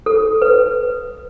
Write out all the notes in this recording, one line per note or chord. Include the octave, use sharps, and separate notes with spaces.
A4
B4